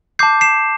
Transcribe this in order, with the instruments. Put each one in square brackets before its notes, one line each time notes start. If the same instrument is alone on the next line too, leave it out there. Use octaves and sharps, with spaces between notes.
[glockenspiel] A5 D6 G6 C7
C7 E7